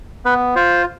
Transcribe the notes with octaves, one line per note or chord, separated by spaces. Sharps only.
B3 B4
F4 C5